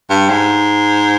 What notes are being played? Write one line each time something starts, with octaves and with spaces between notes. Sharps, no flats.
G2
G#2